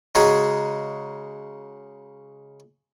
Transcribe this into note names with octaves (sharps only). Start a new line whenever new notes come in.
C#3 G#3 D#4 F#4 G#4